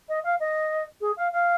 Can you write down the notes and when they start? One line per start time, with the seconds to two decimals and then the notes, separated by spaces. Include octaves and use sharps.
0.08 D#5
0.23 F5
0.39 D#5
1.00 G#4
1.16 F5
1.31 F5